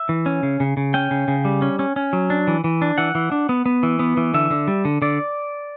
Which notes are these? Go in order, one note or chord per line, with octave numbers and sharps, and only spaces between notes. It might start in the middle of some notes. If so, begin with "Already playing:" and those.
Already playing: E5
E3
C#4
C#3
C#3
C#3
C#4 G5
C#3
C#3
G3
C#4
C#4
C#4
F#3
D4
E3
E3
D4
E3 F#5
E3
D4
B3
B3
E3
B3
E3
D3 E5
D3
G3
D3
D3 D5